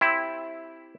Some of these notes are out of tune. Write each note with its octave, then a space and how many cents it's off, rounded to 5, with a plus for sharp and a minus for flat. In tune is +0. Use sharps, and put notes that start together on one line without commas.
C4 +0 E4 +0 G4 +0